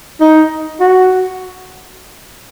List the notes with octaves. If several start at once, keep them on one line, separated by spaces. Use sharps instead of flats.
D#4
F#4